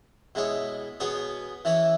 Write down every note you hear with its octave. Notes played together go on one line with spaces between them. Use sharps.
B2 G#3 E4 C#5
B2 B3 G#4 C#5
E3 C#4 E4 C#5